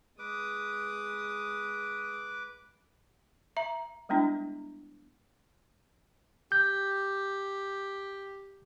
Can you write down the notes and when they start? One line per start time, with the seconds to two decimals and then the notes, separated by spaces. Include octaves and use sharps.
0.19 G#3 B4 D6 D#6
3.57 E5 A#5
4.09 G3 G#3 B3 D4 E4
6.52 G4 G6